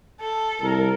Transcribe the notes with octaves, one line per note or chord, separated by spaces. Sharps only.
A4
C2 A#4